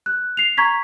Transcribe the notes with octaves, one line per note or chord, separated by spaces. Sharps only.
F#6
C7 F7
A#5 C#6 G#6 B6